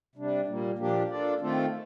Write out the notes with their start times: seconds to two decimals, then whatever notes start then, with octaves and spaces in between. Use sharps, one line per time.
0.16 C3 G3 D4
0.47 A#2 G3 A#3
0.78 A#2 F3 A#3 D4 G4
1.09 A#3 D4 F4 A4 D5
1.40 D#3 A3 C4 F4 A4